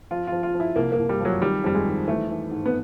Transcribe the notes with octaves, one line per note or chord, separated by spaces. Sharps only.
F3 F4
F3 F4
F4
F3
E4
C2 A#3
A#3
C2
G3
F3 F#3
D#3 G3
F2 G3
G#3
D#3
E3 A3
E3
G#2
B3